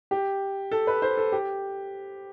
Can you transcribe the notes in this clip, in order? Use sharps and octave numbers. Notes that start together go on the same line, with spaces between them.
G4
A4
B4
C5
A4
G4